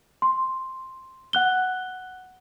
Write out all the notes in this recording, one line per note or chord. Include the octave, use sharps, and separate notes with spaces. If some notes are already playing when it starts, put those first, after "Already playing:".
C6
F#5 F#6 G7